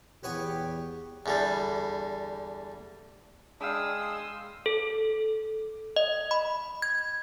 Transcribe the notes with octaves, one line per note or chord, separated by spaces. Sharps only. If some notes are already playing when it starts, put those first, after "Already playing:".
E2 B3 G4 C#5 G#5
E2 D3 G3
G#3 D4 G#4 F5 G5 B5 D#6 E6
C6
A4
D#5
B5
G#6